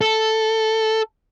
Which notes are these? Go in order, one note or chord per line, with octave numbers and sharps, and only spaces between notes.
A4